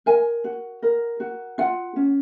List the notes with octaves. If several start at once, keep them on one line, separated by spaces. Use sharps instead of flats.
A#4 G#5
F#4
A#4
F#4
F4 F#5
C#4